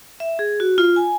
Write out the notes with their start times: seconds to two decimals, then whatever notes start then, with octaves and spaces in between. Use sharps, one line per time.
0.20 E5
0.39 G#4
0.60 F#4
0.78 F4
0.96 G#5